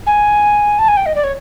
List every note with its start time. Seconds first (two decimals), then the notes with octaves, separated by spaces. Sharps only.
0.06 G#5
0.79 A5
0.88 G#5
0.97 G5
1.06 D#5
1.15 D5
1.24 C#5